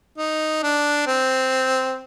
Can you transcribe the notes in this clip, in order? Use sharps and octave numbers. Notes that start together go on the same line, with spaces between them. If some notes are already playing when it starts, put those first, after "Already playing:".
D#4
D4
C4